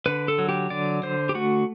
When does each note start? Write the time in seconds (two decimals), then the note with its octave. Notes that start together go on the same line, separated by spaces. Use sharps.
0.06 D3 B4
0.28 A4
0.38 F#3
0.49 G4
0.70 D3 D5
1.03 D3 C5
1.29 G4
1.35 A3 F#4